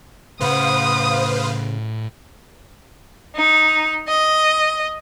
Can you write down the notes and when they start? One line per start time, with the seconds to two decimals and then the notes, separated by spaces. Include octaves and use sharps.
0.40 A2 C#3 B4 C5 F5 F#5 D#6
3.34 D#4
4.08 D#5